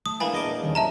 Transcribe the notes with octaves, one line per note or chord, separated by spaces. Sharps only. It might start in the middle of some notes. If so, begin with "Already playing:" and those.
A3 D#6
E3 G#3 A#3 D4 G#5 B5
E2 A3 A#3 G#4 A#4 D#5 D6
A#2
D#2 D#3 F3 G3 C#4 C#5
D3 F#3 E5 A5 A#5